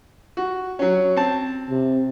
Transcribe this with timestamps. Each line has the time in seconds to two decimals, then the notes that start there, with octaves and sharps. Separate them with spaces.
0.37 F#4
0.79 F#3 C#4
1.16 C4 A5
1.70 C3